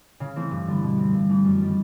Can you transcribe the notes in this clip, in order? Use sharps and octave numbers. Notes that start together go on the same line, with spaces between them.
C#3
E3 A3 C4
G2
D3 G3 B3
B2
G3 C4
G2
E3 A3
F#2
D#3 G3 B3 D#4